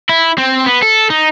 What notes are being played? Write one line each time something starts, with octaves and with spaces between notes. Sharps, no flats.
E4
C4
B3
A4
D#4